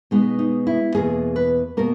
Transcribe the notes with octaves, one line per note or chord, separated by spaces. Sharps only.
B2 G#3 B3 D#4
D#4
E4
E2 B2 A#3 G#4
B4
B2 A#3 A#4